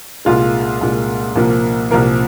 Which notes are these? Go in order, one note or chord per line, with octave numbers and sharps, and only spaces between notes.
C2 A#2 G#3 F4
C2 A#2 G#3
C2 A#2 F3 A#3
C2 A#2 F3 A#3 A#4